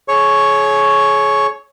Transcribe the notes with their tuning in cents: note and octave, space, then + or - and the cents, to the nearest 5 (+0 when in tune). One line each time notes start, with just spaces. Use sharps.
G#4 +35 C#5 +0 C#6 +0